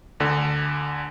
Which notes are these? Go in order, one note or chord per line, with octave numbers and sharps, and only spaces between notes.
D2 D3